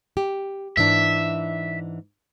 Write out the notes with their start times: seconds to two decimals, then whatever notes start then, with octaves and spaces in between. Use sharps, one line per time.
0.17 G4
0.77 G#2 E3 D4 E5